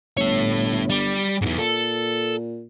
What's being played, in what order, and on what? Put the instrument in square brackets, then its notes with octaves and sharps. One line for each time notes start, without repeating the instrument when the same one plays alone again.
[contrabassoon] G1 [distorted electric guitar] A3 C#5
[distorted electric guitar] G3
[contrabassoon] B1 [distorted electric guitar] E2 G#2
[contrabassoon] A#2 [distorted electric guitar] A4